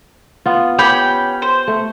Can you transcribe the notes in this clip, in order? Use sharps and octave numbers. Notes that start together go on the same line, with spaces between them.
B3 F4
C#4 G4 G5 B5
C5
A3